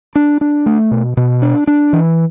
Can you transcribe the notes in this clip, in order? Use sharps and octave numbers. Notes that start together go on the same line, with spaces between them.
D4
D4
A3
B2
B2
D4
D4
E3